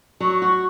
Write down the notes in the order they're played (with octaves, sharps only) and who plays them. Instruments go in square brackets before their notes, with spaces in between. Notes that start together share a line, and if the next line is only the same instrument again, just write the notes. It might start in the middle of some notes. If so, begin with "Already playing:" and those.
[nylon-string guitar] F#3 [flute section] C#6
[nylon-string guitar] F#4 [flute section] C#6